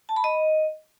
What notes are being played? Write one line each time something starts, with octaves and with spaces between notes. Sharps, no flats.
A5
B5
D#5